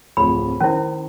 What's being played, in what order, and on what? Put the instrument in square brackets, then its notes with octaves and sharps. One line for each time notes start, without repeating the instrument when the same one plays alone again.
[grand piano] D1 F2 C#5 [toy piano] B5
[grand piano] D#3 C5 [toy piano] C#4 E4